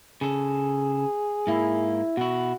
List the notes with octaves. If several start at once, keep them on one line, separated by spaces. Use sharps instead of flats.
C#3 G#4 A4
G#2 A#3 E4
B2 E4 F#4